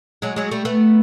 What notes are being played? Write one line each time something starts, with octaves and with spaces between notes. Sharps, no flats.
F#3 G#3
F#3 G#3
G3 A3
A3 B3